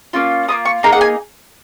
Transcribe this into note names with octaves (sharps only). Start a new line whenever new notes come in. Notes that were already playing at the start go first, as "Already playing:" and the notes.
A#3 C#4 F4
A#3 C#4 F4 D#6
C#6
A#3 D#4 G#4 A#5
F#5
G#5